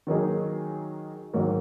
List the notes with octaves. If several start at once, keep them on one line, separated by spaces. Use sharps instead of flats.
D#3 F#3 A#3 D#4 G#4
G#2 D#3 F#3 A#3